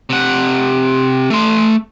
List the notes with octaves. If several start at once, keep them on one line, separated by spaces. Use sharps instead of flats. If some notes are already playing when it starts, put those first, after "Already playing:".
C3 F#5
A3 C6